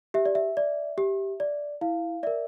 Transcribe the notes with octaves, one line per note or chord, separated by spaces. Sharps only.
G4 E5
D5
E5
D5
G4
D5
E4 F5
A#4 D5 E5